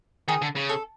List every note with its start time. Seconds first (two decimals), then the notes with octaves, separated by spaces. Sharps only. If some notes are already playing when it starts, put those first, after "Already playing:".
0.28 D#3 G#4
0.42 D3
0.56 C#3
0.69 A4